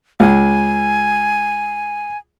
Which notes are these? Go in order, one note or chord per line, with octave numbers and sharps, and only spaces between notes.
C#2 G#5